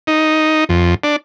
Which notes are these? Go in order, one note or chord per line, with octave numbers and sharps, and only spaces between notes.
D#4
F2
D4